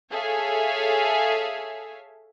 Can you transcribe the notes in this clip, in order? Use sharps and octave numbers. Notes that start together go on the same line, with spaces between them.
G#4 A4 C#5 E5 F5 G#5